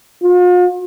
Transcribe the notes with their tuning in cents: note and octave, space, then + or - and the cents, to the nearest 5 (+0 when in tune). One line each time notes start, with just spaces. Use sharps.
F4 +45